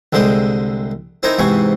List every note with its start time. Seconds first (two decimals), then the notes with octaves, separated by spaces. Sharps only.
0.13 C2 D3 G#3 C5 D#6
1.23 C4 D#4 E4 A#4 G#5 A#5
1.38 E2 G#2 C3 G#5 C#6